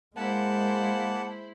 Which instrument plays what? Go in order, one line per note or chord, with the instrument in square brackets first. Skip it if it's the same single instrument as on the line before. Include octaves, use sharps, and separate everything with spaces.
[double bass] G#3 [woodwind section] A#3 [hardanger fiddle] E4 C5 [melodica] F#5 A5